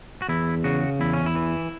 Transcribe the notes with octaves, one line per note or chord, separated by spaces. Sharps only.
F#4
E2 E4
C#3 F#4
E2 E4
C#4
E4
E3